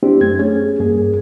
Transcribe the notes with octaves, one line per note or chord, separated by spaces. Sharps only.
B3 C4 D4 E4 G4 C5
F#2 A3 G#6
C#4 G#4
E2 G2 A#3 G#4